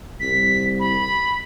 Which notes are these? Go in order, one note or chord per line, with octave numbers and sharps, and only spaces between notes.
C2 B6
B5